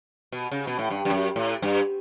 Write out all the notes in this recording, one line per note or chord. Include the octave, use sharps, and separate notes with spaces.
B2
C#3
B2
A2
G2
G2
F#2
A2
G2